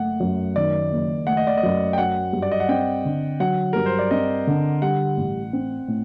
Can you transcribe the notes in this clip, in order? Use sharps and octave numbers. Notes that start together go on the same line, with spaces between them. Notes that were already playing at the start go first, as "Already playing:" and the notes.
Already playing: F#1 A3 F#5
F#2
D#3 D5
F#1
A3 F#5
D#5
D5
D#5
F#2
G5
F#3 F#5
G2
D5
D#5
F#5
C4 G5
D3
F#3 F#5
G2 A#4
C5
D5
C4 D#5
D3
G3 F#5
A1
C4
A2